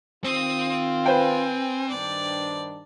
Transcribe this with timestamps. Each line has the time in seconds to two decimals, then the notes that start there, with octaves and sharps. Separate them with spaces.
0.24 D#3 C4 F4 D#6
1.06 B4 C5 G5 G#5
1.89 G2 D#3 D4 D5